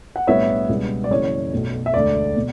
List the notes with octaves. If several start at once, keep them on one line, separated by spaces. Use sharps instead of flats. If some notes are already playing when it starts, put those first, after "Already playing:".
F#5
B1 A2 G3 B3 D4 C#5 E5
C#2 B2 G3 B3 D4
D5
F#1 F#2 E3 C#5
B1 B2 A3
E5
E1 D2 D3 D5
B2